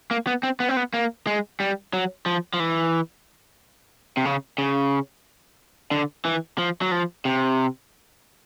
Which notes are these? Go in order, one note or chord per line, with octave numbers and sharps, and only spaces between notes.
A#3
B3
C4
B3
C4
B3
A#3
G#3
G3
F#3
F3
F3
E3
C3
C#3
C#3
D3
E3
F3
F#3
F3
C3